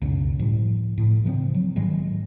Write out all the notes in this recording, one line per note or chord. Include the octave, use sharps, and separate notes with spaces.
C#2 F#2 B2
A2 F3 G3
A2
C#3 F3 G3 C4
F#3
G#2 D#3 F#3 G#3